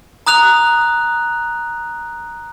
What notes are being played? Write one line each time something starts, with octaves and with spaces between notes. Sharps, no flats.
A#5 D#6 F#6 F7